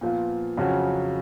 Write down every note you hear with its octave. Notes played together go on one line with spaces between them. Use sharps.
A#2 F3 B3 F4
F2 C#3 F#3 C#4 F#4